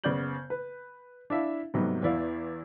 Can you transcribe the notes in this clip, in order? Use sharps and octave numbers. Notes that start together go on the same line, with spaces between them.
F#1 C#3 B3 D5 G6 F#7
B4
D4 E4 E5 F5
G#2 C3 F#3 G3 A3 B3
E2 B3 E4 D5 F5